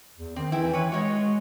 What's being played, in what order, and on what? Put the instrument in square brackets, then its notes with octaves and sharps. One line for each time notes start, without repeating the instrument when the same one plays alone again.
[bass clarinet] E2
[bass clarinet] D#3 [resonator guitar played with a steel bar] C4
[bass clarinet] E3 [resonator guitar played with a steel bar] E4 G5
[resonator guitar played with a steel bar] B4 C#5
[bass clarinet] G#3 [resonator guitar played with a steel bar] F#4 C#5 D#5